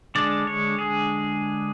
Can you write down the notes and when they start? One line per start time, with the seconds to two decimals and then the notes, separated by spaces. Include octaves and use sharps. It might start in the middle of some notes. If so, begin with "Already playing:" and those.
0.15 D3 G#3 D4 D5
0.47 C#5
0.79 G#4